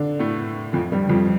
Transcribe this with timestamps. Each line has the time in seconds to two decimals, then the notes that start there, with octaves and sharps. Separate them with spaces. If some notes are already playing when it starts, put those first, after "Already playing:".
Already playing: D3 D4
0.19 A2 A3
0.73 F2 F3
0.92 G2 G3
1.09 F2 F3